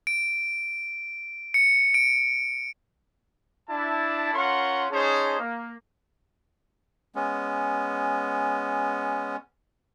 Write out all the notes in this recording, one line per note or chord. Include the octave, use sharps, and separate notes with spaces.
D7
C#7
D7
D4 E4 A5
C#4 F4 A#4 F#5 C6 C#6
C#4 D#4 G#4 C5 C#5 A5
A#3
G#3 B3 C#4